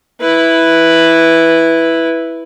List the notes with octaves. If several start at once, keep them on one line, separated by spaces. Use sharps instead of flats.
E4 B4